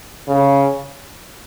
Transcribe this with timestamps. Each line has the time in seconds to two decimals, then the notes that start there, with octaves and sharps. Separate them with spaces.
0.27 C#3